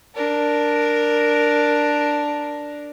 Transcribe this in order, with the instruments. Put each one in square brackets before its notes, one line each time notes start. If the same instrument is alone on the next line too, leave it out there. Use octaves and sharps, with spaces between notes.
[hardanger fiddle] D4 A#4